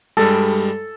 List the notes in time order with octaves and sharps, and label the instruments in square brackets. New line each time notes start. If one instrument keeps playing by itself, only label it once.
[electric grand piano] G2 G3 G#3 [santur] A4